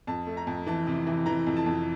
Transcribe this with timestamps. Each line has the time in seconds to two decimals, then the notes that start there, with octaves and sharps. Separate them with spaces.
0.07 F2 A5
0.27 A3
0.37 A#5
0.47 F2
0.67 E3 A5
0.87 C3
1.07 E3
1.26 E3 A#5
1.47 F2
1.57 A5
1.66 F2